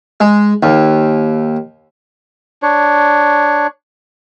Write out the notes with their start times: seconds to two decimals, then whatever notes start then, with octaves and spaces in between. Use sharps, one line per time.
0.21 G#3
0.63 D#2
2.63 D4 C#5